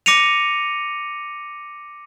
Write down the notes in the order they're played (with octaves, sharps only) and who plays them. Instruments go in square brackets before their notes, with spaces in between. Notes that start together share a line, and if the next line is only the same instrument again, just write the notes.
[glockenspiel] D6 A#6 C#7 D#7 F7